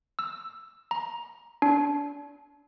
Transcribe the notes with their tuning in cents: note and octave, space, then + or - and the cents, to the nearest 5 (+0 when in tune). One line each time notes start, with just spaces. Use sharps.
E6 +5
A#5 +15
D4 -30